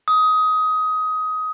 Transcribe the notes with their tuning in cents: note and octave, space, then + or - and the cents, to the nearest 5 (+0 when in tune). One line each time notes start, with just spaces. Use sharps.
D#6 +20